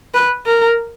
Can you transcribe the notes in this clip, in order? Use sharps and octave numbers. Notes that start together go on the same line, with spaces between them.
B4
A#4